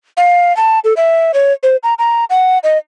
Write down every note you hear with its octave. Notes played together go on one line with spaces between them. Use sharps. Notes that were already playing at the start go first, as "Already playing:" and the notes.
F5
A5
A4
E5
C#5
C5
A#5
A#5
F#5
D#5